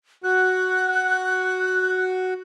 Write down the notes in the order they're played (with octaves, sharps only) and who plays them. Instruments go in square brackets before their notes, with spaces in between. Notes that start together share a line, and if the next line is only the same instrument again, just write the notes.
[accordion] F#4 [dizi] F#6